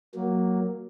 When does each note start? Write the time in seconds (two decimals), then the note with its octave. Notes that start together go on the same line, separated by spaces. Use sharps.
0.14 F#3 A#3